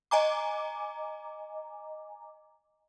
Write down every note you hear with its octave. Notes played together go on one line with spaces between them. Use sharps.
D#5 G#5 A#5 D6